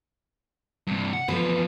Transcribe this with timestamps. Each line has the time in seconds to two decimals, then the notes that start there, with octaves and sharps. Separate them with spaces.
0.87 G2 C3
1.13 F#5
1.28 E2 F3 B4